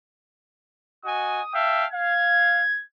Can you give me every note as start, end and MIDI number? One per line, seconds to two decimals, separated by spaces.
1.05 1.42 66
1.05 1.42 75
1.05 1.42 80
1.05 1.54 87
1.54 1.86 76
1.54 1.86 77
1.54 1.86 79
1.54 1.86 81
1.92 2.62 77
1.92 2.81 92